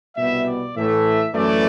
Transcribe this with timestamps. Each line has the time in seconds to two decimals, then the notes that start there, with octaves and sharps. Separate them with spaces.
0.17 C2 B2 G3 B3 E5
0.46 D5
0.76 A2 E3 A3 E5
1.34 F#2 E3 A3 D5